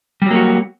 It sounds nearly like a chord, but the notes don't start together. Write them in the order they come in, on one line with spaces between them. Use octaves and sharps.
G3 F#3 A#3 F#4